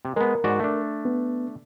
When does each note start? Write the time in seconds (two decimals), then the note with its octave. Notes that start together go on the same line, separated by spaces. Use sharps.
0.05 C3
0.16 G#3 B3 A#4
0.44 G#2 F#4 D5
0.60 A3 D4
1.05 B3